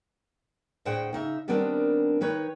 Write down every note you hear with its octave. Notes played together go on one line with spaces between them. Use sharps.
D2 A2 G#4 C5 F#5 G5
C#3 D#4 E5
D#3 G3 B3 C4 D4 A#4
D#3 D#4 B4 C#5